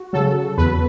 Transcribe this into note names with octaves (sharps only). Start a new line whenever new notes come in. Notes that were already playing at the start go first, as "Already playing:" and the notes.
Already playing: F#4
C#3 F#3 A4
E2 B4